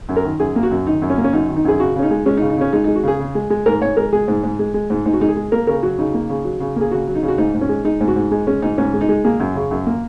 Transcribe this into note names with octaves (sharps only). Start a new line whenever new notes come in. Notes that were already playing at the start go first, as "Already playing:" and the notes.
F#2
A#4
D#3
F#2 G#4
A#3
F#4
F#2
D#3 D#4
F#2
C#4
A#3
C#4
F#2 D#4
D#3
D#4
F#2 G#4
C#3 F#4
C#3 C#4
D#4
G#3
G#3 C#4
D#4
C#3
D#4
C#3 C#4
G#3 D#4
D#4
G#3
F#4
C#3 G#4
C#3
G#3
G#3
G#2 A#4
G#2 C#5
G#3 A#4
G#3 G#4
G#2
G#2
G#3
G#3
G#2
G#2 D#4
F#4
G#3 D#4
G#4
G#3
A#3 A#4
C#3 A#4
F#3 F#4
C#3 D#4
A#3
C#3
F#3
C#3
A#3 G#4
C#3 F#4
F#3
D#4
C#3
F#4
G#2 D#4
G#2
C#4
G#3
G#3 D#4
G#2
F#4
G#2
G#3 D#4
G#3 C#4
G#2 D#4
G#2 C#4
G#3
D#4
G#3
A#3 G#4
F#2
C#3
F#2
A#3